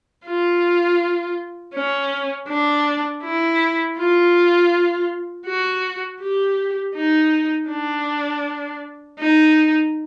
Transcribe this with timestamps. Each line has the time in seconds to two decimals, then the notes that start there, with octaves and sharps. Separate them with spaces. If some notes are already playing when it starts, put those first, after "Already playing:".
0.26 F4
1.74 C#4
2.48 D4
3.23 E4
3.98 F4
5.46 F#4
6.21 G4
6.95 D#4
7.69 D4
9.19 D#4